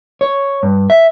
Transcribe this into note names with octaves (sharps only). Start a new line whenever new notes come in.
C#5
G2
E5